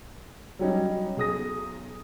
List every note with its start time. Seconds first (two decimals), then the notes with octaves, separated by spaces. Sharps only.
0.59 F#3 G3 C#4 D#4
1.17 B1 G#4 D#6 A#6